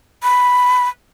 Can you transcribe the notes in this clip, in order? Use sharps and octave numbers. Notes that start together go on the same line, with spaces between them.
B5